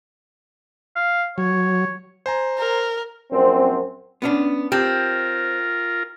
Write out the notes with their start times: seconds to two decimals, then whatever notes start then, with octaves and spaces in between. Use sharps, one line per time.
0.96 F5
1.38 F#3 C#5
2.26 C5 G#5 A#5
2.59 A#4
3.31 A#1 F#2 C4
4.22 B3 C#4 D4
4.72 C4 F4 G4 A#4 A5